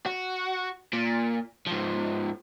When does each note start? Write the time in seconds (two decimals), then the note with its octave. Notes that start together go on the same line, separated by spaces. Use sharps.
0.06 F#4
0.93 A#2
1.67 G#2 F3